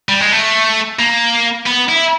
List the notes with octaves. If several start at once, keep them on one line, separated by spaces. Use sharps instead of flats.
G3
G#3
A3
A#3
B3
E4